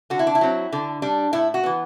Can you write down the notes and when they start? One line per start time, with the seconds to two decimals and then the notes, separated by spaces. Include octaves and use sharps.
0.10 D3 F#4
0.19 E4
0.27 D4
0.35 E4
0.41 F#3 C4
0.73 D3
1.02 G3 D4
1.33 A2 E4
1.54 F#4
1.63 E3 B3